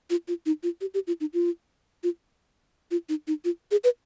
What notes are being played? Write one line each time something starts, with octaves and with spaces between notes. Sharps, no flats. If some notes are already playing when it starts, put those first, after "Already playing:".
F4
F4
D#4
F4
G4
G4
F4
D#4
F4
F4
F4
D#4
D#4
F4
G#4
B4